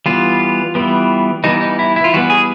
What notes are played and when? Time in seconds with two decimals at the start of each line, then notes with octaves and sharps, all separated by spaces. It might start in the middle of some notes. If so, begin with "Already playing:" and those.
0.06 E3 G3 B3 F4
0.75 E3 G3 B3
1.44 E3 G3 B3 D#4
1.61 D#4
1.79 E4
1.96 E4
2.04 F4
2.13 E3 G3 B3 F#4
2.30 G#4